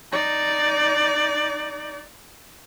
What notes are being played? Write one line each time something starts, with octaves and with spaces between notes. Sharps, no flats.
D#4 D5